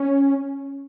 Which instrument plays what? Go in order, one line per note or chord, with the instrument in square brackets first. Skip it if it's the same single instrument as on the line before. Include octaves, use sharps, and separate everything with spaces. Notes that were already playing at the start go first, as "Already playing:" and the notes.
Already playing: [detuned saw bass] C#4